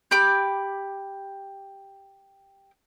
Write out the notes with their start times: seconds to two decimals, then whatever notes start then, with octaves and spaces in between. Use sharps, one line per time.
0.11 G4 B5 D6